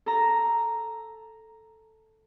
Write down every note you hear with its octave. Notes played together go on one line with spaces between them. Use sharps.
A4 A#5